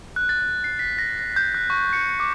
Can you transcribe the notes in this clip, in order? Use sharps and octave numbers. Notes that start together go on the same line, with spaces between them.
F#6
A6
C7
B6
A#6
A#6
G6
F#6
C#6
C#7
D6